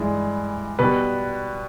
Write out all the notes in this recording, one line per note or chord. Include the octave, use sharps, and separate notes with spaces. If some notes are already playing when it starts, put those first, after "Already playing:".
Already playing: G2 E3 G#3
B2 G3 B4